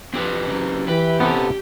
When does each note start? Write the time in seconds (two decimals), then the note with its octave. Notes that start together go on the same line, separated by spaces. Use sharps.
0.14 F2 C4 G4 B4
0.47 C#3 F#3
0.88 E3 G4 B4
1.20 C3 B3 C#4 A4